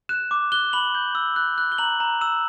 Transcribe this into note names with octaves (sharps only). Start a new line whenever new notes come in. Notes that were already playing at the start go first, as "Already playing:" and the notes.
F#6 E7
D6
F#6 G7
B5 F#7
G6
E6
F#6
F#6
G7
A#5 F#7
A#5
E6 E7